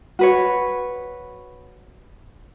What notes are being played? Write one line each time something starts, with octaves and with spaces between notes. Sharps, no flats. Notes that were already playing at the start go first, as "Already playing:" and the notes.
F#4 B4 C#5